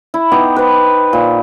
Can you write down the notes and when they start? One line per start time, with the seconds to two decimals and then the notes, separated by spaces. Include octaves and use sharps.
0.14 E4
0.32 B3 D#4 G4
0.56 B4 C5
1.13 A#2